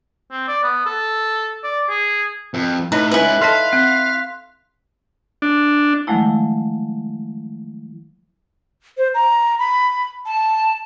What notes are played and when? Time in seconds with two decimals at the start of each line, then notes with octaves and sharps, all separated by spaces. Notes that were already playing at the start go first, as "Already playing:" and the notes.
0.31 C4
0.48 D5
0.63 B3
0.86 A4
1.64 D5
1.89 G#4
2.54 F2
2.92 A2 D#4 B4 D#5
3.11 G#3 C#4 E4 B4
3.41 A4 D#5 F5 A5 C6 F#6 B6
3.73 C4 F#6 B6
5.42 D4
6.07 D#3 F3 F#3 G#3 A3 E4
8.98 C5
9.14 A#5
9.59 B5
10.26 A5